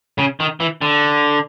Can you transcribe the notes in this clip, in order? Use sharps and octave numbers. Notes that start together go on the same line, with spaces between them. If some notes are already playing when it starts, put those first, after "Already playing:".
C#3
D#3
E3
D3